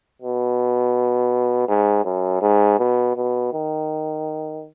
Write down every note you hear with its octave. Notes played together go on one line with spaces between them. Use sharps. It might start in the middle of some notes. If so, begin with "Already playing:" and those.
B2
G#2
F#2
G#2
B2
B2
D#3